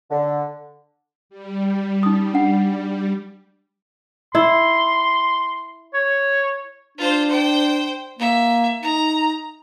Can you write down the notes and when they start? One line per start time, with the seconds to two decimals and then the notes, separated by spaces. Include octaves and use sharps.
0.11 D3
1.29 G3
2.03 D#4 D#6
2.34 D4 F#5
4.35 E4 C6
5.94 C#5
6.98 D4 F4 C5
7.29 C5 G5
8.19 A#3 E5
8.83 D#4 A#5